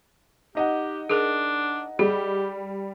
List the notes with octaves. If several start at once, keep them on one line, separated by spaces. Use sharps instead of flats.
D#4 G4 D#5 F#5
D4 G#4 A#4
G3 G4 G#4